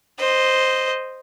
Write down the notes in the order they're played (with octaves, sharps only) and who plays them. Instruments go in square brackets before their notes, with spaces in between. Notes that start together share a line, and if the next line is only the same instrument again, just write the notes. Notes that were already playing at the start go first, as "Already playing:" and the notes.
[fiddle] C5 D#5